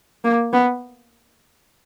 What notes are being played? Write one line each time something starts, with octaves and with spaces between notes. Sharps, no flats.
A#3
B3